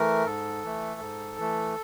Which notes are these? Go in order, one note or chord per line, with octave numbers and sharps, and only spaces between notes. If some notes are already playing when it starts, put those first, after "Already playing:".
Already playing: E3 A3 A#4
G#2 A4
E3 A3
G#2
E3 A3